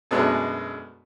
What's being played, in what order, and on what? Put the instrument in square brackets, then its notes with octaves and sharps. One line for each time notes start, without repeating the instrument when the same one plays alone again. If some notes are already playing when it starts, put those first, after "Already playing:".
[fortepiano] F#2 B2 G#3 A3 B3 D4